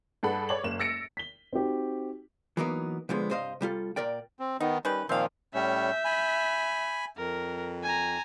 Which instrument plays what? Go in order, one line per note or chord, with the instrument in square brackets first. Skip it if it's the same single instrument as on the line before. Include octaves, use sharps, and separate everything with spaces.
[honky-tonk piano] G2 G#4 A4 F#5 B5
C#5 D5 F#7
F#1 A#3 E7
E6 A6 A#6 C#7 D7
[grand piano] B6 G7
C4 D#4 F#4 G4
[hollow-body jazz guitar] E3 F#3 A#3 B3 D#4 A#4
B2 D3 F3 G#3 B3
C2 G2 C5 D#5 F5
C3 G3 F4 A4
A#2 A#4 D5 G5
[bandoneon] C4
[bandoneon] D#3 B3 [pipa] D#4
[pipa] D#3 C#4 B4 [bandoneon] G3
[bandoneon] A#2 D#3 F3 [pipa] C4 F5
[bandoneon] A2 G3 C#4 [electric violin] E5 G6
[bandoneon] G#5 B5
[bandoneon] F2 [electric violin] A#4
[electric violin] G#5 A#5